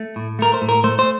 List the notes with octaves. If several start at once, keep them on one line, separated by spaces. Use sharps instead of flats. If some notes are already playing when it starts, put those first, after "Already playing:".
Already playing: A3
A2
A3 A#4
C5
A2
A#4
A3 C5
C5